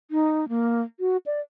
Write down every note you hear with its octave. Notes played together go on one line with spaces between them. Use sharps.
D#4
A#3
F#4
D5